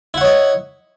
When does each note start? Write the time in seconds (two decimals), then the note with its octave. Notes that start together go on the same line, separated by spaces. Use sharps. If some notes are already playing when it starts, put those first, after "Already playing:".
0.14 E4
0.18 F#5
0.21 C#5
0.25 D#5